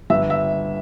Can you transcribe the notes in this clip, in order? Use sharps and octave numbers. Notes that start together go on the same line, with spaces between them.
G1 E5
E5